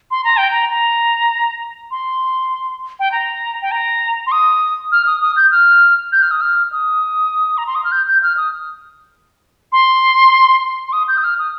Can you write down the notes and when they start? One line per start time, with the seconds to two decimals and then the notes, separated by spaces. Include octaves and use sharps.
0.11 C6
0.24 A#5
0.37 G5
0.51 A#5
0.71 A#5
1.91 C6
3.00 G5
3.12 A#5
3.62 G5
3.71 A#5
4.27 C6
4.32 D#6
4.92 F6
5.06 D#6
5.21 D#6
5.37 G6
5.51 F6
6.12 G6
6.22 F6
6.31 D#6
6.41 F6
6.72 D#6
7.58 A#5
7.67 C6
7.75 D#6
7.84 F6
7.92 G6
8.08 G6
8.23 F6
8.37 D#6
9.72 C6
10.88 C6
10.93 D#6
11.08 G6
11.18 D#6
11.24 F6
11.39 D#6